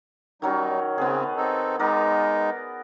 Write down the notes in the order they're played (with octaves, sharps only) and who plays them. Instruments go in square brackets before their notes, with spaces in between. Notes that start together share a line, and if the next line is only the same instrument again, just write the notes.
[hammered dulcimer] D#3 F#3 C#4 [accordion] G3 D#4
[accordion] C#3 C4 [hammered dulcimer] B3 G#4
[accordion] C4 D#4 A4
[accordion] G#3 D#4 [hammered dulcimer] B3 A#4 D5